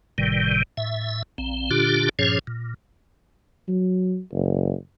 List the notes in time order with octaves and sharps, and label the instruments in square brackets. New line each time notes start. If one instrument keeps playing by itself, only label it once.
[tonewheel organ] G1 A2 C3 D#3 G3
A2 E5
A#1 C4
A#2 D3 D4 F4 G4
G2 A#2 F3 C#4 G#4 C#5
A#2
[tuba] F#3
F#1